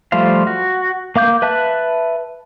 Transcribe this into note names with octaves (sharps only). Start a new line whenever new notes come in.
F3 G3 A3 C5 F5
F#4
A#3 F5 D6 G6
B4 E5 A5 F#6